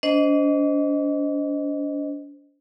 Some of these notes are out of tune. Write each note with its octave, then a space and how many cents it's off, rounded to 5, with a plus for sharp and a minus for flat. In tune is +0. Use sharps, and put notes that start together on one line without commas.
D4 -40 C5 -10 D#5 +0